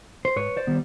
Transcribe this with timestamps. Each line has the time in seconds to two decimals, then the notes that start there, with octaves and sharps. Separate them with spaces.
0.25 C5
0.36 G#2 B4 C#5
0.57 C5 D5
0.67 D#3 G3 B3